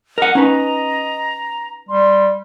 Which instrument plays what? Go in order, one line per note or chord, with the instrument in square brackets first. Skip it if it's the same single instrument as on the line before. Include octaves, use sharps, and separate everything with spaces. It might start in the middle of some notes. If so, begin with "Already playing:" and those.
[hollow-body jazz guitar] A#4 F#5 [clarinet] D#5
[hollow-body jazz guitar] C#4 D#4 B4 [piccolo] A#5
[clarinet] G3 [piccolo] C6